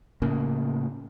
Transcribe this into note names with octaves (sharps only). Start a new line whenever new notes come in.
A2 C#3 A#3